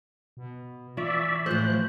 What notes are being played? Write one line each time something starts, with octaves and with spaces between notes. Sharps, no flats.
B2
E3 F4 D5 E5 C#6
A2 F3 C5 F#6 G6